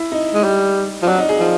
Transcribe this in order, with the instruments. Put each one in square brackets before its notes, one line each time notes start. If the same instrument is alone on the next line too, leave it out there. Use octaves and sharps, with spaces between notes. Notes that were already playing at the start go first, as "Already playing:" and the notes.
Already playing: [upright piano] E4
D#4
[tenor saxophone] G#3
G3
F3
[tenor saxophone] F#3 [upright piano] D4
[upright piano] D#4
G#4
[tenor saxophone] F3